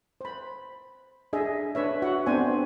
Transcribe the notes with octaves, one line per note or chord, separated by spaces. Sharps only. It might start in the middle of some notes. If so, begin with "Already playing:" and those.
C5 B5
D4 G#4 D#5 E5
D4 B4 C#5 E5
F#4 E5 F#5
B3 C4 D4 C5 G#5